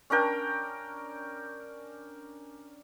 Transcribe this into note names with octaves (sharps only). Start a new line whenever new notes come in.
C#4 D4 A#4 G5